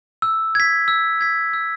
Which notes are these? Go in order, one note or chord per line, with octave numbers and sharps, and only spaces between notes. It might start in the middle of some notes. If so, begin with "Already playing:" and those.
E6
G#6 B6
E6
G#6 B6
E6